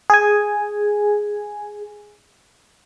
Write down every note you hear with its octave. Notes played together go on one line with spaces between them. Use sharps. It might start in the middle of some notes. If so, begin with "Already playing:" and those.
G#4 G#5